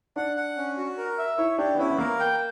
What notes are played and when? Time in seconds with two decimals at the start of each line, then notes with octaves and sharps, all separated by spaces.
0.16 D4 F#5
0.36 F#5
0.57 C#4
0.77 F#4
0.98 A#4
1.18 E5
1.38 E4 C#5
1.58 D4 G4
1.75 B3
1.78 C#4 E4
1.90 B3
1.98 A#3 A#4
2.20 G5